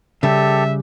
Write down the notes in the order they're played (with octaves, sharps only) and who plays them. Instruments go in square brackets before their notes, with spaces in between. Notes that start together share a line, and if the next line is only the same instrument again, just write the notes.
[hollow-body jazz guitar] C#3 G3 [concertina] G4 A4 [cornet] E5